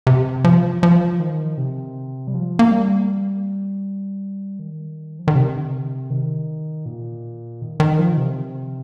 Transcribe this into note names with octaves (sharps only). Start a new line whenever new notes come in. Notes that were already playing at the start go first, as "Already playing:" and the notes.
C3
F3
F3
D#3
C3
G3
F3
A#3
G3
D#3
F3
D#3
C3
D#3
A#2
D#3
D#3
F3
D#3
C3